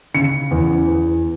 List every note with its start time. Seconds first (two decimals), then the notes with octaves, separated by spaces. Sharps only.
0.14 C#3 C#7
0.51 E2
0.87 E2